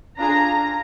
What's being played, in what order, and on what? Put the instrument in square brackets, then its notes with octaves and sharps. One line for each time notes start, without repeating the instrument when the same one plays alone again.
[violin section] D4 F4 G#4 A#5